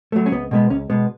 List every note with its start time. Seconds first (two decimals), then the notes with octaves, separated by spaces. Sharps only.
0.12 F#3 A3
0.26 C#4
0.32 C#2 B3
0.51 B2 G#3 B3
0.70 C#2 C#4
0.90 B2 G#3 B3